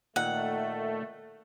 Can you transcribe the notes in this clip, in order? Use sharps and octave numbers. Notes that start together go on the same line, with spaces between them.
A#2 D#3 A3 F#5